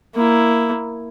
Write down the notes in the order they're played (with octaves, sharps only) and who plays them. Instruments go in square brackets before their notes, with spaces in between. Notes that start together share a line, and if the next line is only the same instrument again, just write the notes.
[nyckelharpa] A#3 E4